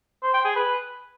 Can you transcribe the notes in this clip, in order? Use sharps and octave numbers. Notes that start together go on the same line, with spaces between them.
C5
G5
G#4
B4